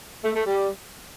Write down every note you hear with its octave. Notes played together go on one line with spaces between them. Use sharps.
A3
A3
G3